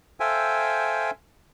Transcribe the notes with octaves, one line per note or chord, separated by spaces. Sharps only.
A4 C5 E5 F5 G5 G#5